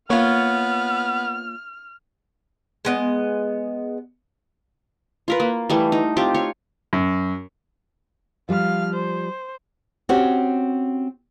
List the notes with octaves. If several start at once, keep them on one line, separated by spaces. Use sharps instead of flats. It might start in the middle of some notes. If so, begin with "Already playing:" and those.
A#3 B3 F4 C#5 F6
G#3 B3 D#5
F4 A#4 B4
A#3
E3 G3 A3
D#4
C4 F4 G4
F4 C#5
F#2
F3 G3 F5 F6
C5
C4 C#4 F#4 G4 C#5